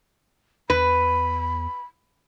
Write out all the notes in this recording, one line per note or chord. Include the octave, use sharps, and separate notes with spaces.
E2 B4 B5